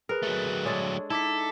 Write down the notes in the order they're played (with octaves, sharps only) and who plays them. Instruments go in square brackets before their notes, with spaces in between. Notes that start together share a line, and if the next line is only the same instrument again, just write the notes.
[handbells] G#4 B4 [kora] A#4
[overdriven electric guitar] F#3 A3
[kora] G#3 D4 A4 [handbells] C#5
[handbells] D#4 D6 B6 [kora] E4 [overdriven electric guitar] A4
[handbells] B6